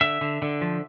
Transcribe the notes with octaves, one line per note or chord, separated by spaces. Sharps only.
D3 E5
D3
D3
F3